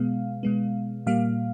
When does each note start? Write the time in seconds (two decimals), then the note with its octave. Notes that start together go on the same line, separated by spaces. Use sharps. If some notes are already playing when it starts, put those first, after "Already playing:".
Already playing: B2 G#3 B3 F5
0.43 B2 G#3 B3
1.06 A#2 G3 A#3 F5